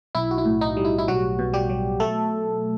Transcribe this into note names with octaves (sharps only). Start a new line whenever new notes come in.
B1 E4
F#4
E4
A2
D#4
G3
E4
E4
B1 F#3 F#4
B2
G3 G4
F#3
A3 A4